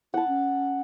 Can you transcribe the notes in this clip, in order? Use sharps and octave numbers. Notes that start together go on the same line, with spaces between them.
E4 F#5 A5
C#4